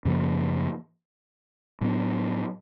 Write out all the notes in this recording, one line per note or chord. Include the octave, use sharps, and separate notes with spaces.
F#2 C#3 F3 A#3
A2 F#3 B3 D4